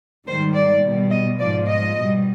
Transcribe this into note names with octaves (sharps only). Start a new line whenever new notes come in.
G#2 D#3 G3 C5
D5
B2 G3
D#5
G#2 F3 D5
D#5
B2 G3